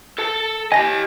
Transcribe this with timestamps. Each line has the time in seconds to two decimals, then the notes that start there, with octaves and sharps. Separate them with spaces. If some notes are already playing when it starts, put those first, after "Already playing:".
0.18 A4 A5
0.72 G4 D#5 G#5 A#6